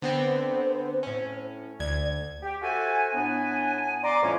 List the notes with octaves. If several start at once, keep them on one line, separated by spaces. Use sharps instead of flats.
D3 B3 C4 C5
A2 C#4
D2 D5 G#6
G4
F#4 A4 C5 E5 G#5
A2 B3 D4 G#5
D5 A#5 C6 D6
F2 A2 E3 G3 A3 C#4